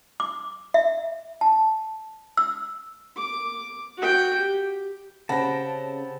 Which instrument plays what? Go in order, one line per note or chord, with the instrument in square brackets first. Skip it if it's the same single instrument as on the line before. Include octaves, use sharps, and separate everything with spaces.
[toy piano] D6
E5
A5
E6
[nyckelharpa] D6
F#4 G5
G4
[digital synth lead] C#3 [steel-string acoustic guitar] C4 G4 [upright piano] F#5 B5 A#6 [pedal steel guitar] A5